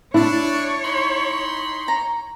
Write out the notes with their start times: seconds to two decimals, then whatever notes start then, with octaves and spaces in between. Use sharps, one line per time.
0.14 D4 E4 C#5
0.84 D#4 B5 C6
1.88 A#5